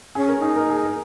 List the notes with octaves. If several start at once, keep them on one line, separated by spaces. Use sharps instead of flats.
C#4 G#4
A#4
D#4 G#4
A#4
G#4
A#4